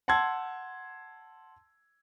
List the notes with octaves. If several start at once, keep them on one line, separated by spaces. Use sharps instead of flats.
F#5 A5 C6 E6 G#6